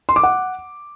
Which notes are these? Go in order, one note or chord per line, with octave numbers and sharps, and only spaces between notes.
C6
D6
F#5